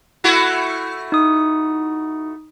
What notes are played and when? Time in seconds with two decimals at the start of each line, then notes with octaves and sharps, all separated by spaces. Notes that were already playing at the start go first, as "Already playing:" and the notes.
0.24 A3 E4 F#4
1.12 D#4 D#6